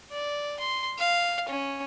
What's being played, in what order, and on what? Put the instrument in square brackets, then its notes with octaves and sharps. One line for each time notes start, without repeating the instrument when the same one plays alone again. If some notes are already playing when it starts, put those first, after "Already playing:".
[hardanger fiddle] D5
C6
F5
C#4